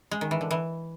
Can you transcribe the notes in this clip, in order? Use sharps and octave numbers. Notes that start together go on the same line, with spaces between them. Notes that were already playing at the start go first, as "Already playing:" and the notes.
G#3
D#3
E3
D3
E3